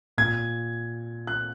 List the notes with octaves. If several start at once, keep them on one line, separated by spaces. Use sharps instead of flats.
A#2 G#6
F#6